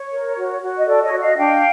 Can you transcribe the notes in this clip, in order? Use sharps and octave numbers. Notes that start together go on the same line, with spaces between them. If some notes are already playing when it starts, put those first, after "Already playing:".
Already playing: C#5
A#4
F#4
F#4
D#5
A4 D5
C#5 D#5
F#4
D#5 F5
D4 F5 G5